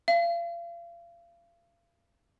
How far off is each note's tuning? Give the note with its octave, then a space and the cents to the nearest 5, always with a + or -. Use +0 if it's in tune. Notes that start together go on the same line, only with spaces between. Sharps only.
F5 -35